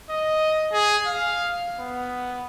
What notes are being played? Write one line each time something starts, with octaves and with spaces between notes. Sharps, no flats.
D#5
G#4
F5
B3